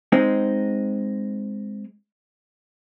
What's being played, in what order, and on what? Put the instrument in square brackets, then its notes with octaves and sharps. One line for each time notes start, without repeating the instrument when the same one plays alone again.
[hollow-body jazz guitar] G#3 C4 D#4